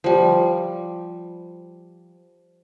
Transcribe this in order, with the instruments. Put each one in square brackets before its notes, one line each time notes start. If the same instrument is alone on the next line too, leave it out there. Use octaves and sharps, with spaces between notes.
[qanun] F3 G3